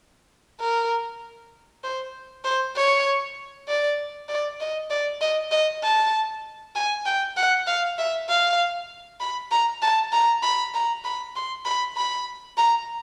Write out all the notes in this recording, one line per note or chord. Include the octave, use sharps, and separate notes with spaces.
A#4
C5
C5
C#5
D5
D5
D#5
D5
D#5
D#5
A5
G#5
G5
F#5
F5
E5
F5
B5
A#5
A5
A#5
B5
A#5
B5
C6
B5
B5
A#5